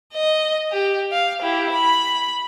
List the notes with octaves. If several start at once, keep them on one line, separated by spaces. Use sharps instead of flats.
D#5
G4
F5
E4 G4
B5